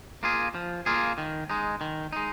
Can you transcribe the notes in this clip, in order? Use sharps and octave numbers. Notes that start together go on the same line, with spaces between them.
A#3 F4 G#4
F3
A#3 F4 G#4
D#3
G#3 D#4
D#3
G#3 D#4